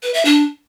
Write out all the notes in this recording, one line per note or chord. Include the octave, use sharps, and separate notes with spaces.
B4
E5
D4